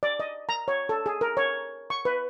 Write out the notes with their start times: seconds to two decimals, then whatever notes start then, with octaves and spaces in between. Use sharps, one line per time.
0.03 D5
0.20 D#5
0.49 A#5
0.68 C#5
0.89 A4
1.06 G#4
1.21 A#4
1.37 C#5
1.90 C#6
2.05 B4